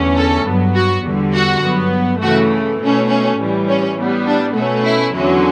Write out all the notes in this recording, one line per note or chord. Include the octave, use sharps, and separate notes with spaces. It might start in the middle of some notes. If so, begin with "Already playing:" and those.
Already playing: E2 D3 A3 C#4
A4
G2 F#3 B3
F#4
E2 D3 G3
F#4
G2 F#3 B3
C#3 E3 A3 F#4
B2 A3 C#4
C#4
A2 E3 G3
C#4
A2 G3 B3
D4
B2 A3 C#4
E4
E2 D3 F#3 C#4